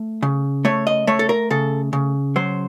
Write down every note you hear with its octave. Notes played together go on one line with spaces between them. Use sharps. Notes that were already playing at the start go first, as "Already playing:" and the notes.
Already playing: A3
C#3
A3 C#5
D#5
A3 C#5
A4
A#4
C#3 A4
C#3
F#3 C5